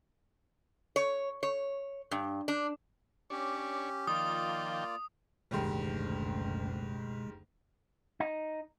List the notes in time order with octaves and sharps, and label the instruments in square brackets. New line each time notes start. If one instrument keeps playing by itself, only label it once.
[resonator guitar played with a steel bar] C#5
C#5
G2
D4
[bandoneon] C#4 G4 [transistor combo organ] D4 C#5
[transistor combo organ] D#3 F3 G5 [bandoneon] A#3 F4 D5 [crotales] D#6
[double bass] F#1 D2 [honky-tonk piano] G#2 D#3 G3 [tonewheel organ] B2 [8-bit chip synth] G#3
[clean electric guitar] D#4